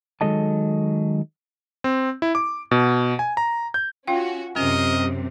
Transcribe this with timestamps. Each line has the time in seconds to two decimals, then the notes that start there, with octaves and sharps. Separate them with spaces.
0.21 D#3 F#3 G#3 A4 D#5 A5
1.84 C4
2.22 E4
2.35 D6
2.71 B2
3.19 G#5
3.37 A#5
3.74 G6
4.08 C#4 F4 F#4 F5 G5
4.56 F#2 C3 C#4 A#4 D#5